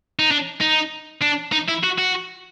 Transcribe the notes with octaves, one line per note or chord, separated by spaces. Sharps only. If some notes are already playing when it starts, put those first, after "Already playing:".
D#4
D4
D#4
D4
D#4
E4
F#4
F#4